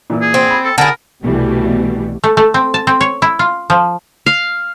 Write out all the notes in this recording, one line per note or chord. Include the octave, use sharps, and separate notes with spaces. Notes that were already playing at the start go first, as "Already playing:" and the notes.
A#2 E3 E4
G#4
C4
B5
A4
D3 G#4 A#4 A5 B5
C2 B2 E3 G3 A3
A3
A3
C4
A5
C4
C#5
E4
F4
F3
F5